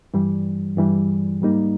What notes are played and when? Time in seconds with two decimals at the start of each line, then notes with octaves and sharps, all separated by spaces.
0.14 G2 E3 G3
0.77 G2 E3 G3
1.42 G#2 G3 A#3 D#4